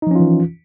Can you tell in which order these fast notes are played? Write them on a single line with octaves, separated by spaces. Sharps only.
D#4 F3 C#4 F4 E3